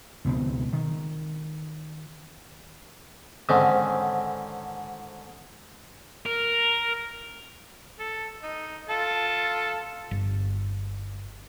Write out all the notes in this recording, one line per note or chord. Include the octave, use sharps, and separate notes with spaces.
C#2 B2 D#3 C4
D#3
G#2 D3 D#3 C4 C#4
A#4
A4
D#4
F4 A4 A5
G1